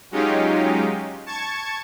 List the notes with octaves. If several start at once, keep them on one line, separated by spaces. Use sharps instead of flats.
F#3 G#3 C#4 D#4 F4 G4
A5 C#6 G#6